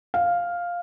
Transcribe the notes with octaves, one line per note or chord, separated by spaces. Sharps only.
F5